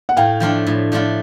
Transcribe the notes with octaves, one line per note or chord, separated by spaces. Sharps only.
F#5
A2 F5 G5
F3 A3 D4 F4
A2
F3 A3 D4 F4